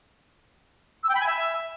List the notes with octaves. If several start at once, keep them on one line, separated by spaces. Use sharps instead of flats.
E6
G5
B5
G#5
E5